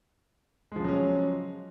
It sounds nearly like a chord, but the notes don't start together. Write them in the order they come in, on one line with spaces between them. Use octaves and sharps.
G#3 F3 C#3 F#3 C#4